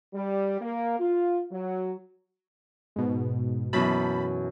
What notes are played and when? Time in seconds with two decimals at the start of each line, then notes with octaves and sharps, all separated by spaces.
0.14 G3
0.61 A#3
0.98 F4
1.52 F#3
2.96 G#2 B2
3.73 F#2 B2 E3 A5 B5